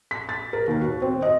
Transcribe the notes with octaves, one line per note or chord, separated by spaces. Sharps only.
B6
A6
A#4
D#2
F#4
C4
D#5